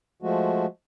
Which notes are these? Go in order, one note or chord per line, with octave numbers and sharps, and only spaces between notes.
F3 G#3 A3 F#4